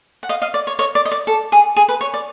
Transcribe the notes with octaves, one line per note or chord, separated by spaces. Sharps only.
F#5
D#5 F5
D#5 F5
D5
C#5
C#5 D#5
D5
D#5
D5
A4
G#4
G#4
B4
C#5
D5